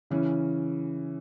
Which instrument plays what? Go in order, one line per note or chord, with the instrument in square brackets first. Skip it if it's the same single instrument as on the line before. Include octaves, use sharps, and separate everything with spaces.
[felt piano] C#3 E3 C#4